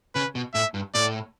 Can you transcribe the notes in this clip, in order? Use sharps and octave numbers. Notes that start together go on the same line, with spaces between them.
C#3 B4
B2
A2 E5
G2
A2 D5